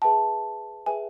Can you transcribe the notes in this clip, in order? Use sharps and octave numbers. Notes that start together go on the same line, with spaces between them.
G#4 B4 E5 G5 A5
G#4 B4 E5 G5 G#5